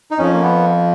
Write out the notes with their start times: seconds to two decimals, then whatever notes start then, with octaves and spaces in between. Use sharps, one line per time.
0.11 D#4
0.18 F2 F3 C#4
0.33 A#3
0.42 B3